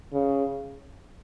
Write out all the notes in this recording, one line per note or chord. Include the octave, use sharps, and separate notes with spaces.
C#3